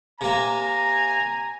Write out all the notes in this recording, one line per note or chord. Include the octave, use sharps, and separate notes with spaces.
C3 A#3 G#5 A#5